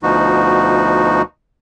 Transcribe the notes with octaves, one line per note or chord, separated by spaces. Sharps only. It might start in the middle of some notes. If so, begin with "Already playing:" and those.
D2 B2 F3 D#4 F#4